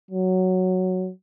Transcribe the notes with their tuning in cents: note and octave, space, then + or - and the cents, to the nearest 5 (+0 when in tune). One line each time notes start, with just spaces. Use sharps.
F#3 +0